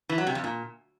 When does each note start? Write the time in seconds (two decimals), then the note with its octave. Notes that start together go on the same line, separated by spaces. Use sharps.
0.09 E3
0.18 F#3
0.27 C3
0.35 F2
0.44 A#2